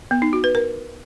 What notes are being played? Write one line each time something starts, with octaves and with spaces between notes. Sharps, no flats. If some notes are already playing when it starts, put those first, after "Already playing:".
B3
D#4
F#4
B4
A#4